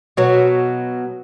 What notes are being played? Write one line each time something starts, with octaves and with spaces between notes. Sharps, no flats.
B2 F#3